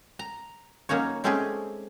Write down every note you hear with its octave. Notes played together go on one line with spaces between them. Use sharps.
A#5
F#3 A#3 C#4 D#4 C#5
G#3 A3 C4 C#4 G4 G#4